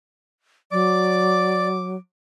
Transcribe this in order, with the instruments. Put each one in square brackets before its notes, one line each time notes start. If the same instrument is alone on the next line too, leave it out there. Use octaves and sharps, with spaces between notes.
[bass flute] F#3 [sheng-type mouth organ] D5 [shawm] D6